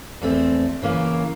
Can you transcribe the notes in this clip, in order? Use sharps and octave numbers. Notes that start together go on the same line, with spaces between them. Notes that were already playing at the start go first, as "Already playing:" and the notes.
E2 A3 C4
C#3 E3 A#3